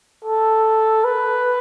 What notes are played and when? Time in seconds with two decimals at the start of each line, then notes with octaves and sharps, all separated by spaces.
0.25 A4
1.04 B4